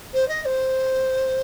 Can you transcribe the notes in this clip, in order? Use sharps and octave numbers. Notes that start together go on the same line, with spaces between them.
C5
D#5
D#5
C5